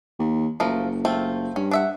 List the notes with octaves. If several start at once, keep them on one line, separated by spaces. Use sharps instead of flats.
D#2
F#1 F3 A3 A#4
A3 C4 F4
G2 C#4
D4 E5 F#5